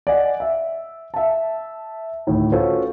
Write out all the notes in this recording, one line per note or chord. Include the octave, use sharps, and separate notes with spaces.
D5 D#5 F#5 G#5
E5
E5 A5
D2 A2 D#3
C#4 F4 F#4 A4 B4 C5